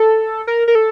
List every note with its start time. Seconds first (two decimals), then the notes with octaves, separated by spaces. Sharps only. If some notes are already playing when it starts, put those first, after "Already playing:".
Already playing: A4
0.47 A#4
0.68 A#4
0.75 A4